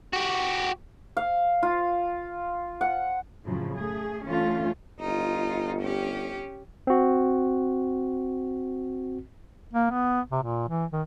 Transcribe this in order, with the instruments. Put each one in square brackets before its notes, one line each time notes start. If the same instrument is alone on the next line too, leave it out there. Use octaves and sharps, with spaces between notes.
[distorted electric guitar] F#4 G4
[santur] F5
F4
F#5
[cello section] F#2 A2 C#3 F3 F#3
A3 G#4
D3 E3 A3 C#4 F4
[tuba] G1 [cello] D#4 F4
[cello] C#4 G4
[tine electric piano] C4 F#4
[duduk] A#3
B3
C3
A#2
E3
D#3